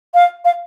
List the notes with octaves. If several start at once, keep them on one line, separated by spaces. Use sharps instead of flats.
F5
F5